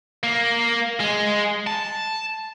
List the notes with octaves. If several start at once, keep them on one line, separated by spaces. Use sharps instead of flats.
A#3
G#3
A5